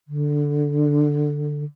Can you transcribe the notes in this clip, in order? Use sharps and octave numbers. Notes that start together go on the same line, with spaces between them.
D3